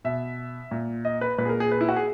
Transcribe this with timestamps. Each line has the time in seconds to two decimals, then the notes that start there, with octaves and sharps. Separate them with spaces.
0.05 B2 E5
0.71 A#2
1.05 D#5
1.21 B4
1.38 A#2 B4
1.45 G#4
1.49 A#4
1.60 G#4
1.72 B4
1.81 E4
1.89 F#4
1.96 G#4